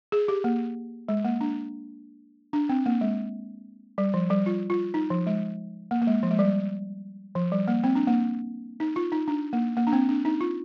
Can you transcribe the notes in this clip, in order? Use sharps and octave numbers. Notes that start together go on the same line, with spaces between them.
G#4
G4
A#3
G#3
A#3
D4
D4
C4
A#3
G#3
G3
F3
G3
F4
F4
D#4
F3
G#3
A#3
A#3
G#3
F3
G#3
G3
F3
G3
A#3
C4
D4
A#3
D#4
F4
D#4
D4
A#3
A#3
D4
C4
D4
D#4
F4